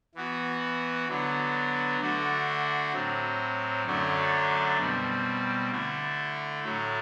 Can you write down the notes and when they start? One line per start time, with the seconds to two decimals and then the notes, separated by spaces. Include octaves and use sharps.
0.15 E3 B3 F#4
1.08 D3 F#3 B3 D4
2.00 D3 A3 D4 F#4
2.93 A2 F#3 C4
3.86 F#2 D3 F#3 A3 D4
4.78 B2 G3 C4
5.71 D3 A3 E4
6.64 A2 F#3 A3